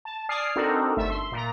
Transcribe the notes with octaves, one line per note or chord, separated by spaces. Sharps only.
A5
D5 G#5 D#6 F6 C7
C4 D4 D#4 F#4 A4 A#4
G1 A3 E5
C6
A#2 A#5